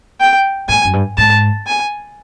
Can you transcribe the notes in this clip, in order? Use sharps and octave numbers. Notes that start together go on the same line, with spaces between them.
G5
G#2 G#5
F#2
G2
G#2 A5
G#5